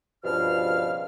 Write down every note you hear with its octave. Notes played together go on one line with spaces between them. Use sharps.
C#2 G2 B2 F3 F5 F6